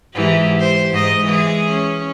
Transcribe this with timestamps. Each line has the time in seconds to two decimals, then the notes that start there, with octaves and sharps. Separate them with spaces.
0.14 G#2 E3 G4
0.59 G4 C5
0.92 G#2 D#5
1.25 E3 G#3 G#4
1.70 C#4